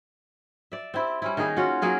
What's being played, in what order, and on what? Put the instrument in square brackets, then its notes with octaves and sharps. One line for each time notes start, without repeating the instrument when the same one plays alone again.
[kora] D5 E5
C4 E4 G4
G3 C#4 E4
D#3 A#3 D#4 G#4
C#4 F4 F#4
F#3 A#3 G#4 F5